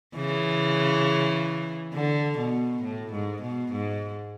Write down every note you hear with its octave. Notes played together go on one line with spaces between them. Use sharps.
C#3 E3
D3
B2
A2
G#2
B2
G#2